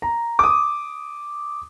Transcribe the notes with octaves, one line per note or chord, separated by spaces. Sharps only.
A#5
D6 D#6